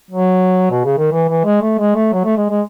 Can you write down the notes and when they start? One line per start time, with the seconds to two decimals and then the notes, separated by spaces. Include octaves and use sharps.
0.11 F#3
0.71 B2
0.85 C#3
0.98 D#3
1.12 E3
1.29 E3
1.45 G#3
1.62 A3
1.79 G#3
1.95 A3
2.13 F#3
2.24 A3
2.37 G#3
2.50 G#3